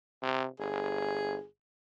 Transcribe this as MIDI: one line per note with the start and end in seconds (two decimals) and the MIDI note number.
0.23 0.46 48
0.59 1.39 31
0.59 1.45 68